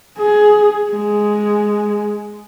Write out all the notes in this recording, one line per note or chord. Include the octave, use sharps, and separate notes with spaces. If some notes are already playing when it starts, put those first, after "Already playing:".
G#4
G#3